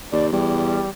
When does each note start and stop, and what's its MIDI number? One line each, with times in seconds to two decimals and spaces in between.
0.12 0.29 39
0.12 0.26 74
0.32 0.83 40
0.32 0.89 55